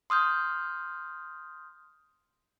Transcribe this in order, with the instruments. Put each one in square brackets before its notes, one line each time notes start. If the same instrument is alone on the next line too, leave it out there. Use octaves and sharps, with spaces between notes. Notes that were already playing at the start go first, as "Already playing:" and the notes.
[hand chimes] C6 D#6 F6 G6